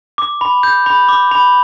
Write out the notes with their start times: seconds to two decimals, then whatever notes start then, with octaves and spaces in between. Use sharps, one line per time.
0.18 D6
0.41 B5
0.63 G6
0.86 B5
1.09 D6
1.31 B5